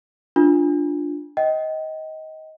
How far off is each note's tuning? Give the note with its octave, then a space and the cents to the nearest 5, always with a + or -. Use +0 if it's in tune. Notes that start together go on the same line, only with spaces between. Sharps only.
D4 +0 F4 +0
D#5 +20 G5 -30